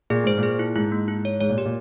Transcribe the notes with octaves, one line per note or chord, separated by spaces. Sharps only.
A#2 G#4
G#2 C5
A#2
G#4
E4
G#2 E4
A#3
E4
C#5
G#2 C#5
A#2
G4
A#2